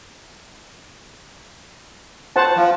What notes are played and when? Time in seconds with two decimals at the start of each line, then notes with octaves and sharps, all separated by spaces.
2.36 C5 F#5 A5
2.57 F3